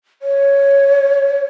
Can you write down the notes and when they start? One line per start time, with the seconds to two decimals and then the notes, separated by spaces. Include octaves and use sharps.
0.22 C#5